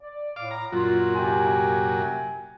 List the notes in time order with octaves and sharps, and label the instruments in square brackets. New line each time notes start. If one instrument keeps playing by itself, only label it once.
[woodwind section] D5
[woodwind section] A2 [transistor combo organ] F5 D6
[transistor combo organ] A#5
[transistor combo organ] F#2 A#2 F#3 [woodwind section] F4
[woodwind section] C3 G5 G#5